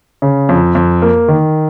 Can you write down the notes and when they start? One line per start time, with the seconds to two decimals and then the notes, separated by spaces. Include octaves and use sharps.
0.22 C#3
0.49 F2
0.75 F2
1.02 A#3
1.28 D#3